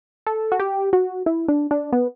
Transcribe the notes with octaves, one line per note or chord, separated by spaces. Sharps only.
A4
F#4
G4
F#4
E4
D4
D4
B3